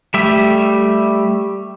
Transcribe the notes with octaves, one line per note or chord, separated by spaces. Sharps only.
G3 A3 G4 E5